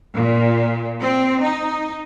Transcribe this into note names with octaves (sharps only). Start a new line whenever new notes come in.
A#2
C4
D#4